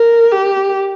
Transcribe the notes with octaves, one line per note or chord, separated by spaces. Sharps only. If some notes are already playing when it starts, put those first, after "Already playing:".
Already playing: A#4
G4